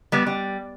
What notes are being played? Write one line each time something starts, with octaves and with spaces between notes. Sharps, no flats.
G3 B3
G3